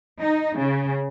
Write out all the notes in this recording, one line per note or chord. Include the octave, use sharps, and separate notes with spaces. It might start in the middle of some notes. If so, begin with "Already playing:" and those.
D#4
C#3